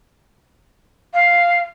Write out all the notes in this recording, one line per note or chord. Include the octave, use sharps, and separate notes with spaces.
F5